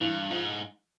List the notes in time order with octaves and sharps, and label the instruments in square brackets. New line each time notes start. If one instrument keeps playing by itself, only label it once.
[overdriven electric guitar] G2 [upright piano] E3
[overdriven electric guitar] G#2 [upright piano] F3